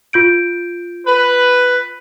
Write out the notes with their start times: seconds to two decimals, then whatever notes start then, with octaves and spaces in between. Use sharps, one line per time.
0.13 F4 G6 D7
1.06 B4